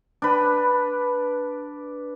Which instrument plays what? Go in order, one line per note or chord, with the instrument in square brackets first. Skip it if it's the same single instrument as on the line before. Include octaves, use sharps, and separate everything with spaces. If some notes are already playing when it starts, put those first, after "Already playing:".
[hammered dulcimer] D4 B4